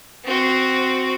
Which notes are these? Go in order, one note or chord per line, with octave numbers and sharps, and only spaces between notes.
C4 F#4